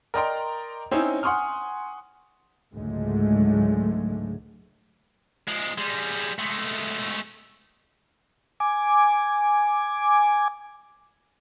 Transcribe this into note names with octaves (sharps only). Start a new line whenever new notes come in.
A#4 D5 D#5 G5 A#5 C6
C4 C#4 D#4 E4 C#5
F#5 G#5 C6 C#6 D#6 F6
C#2 G#2 D3 F#3 G#3 A3
F3 G#3
G3 G#3
G#3 A3
G#5 D6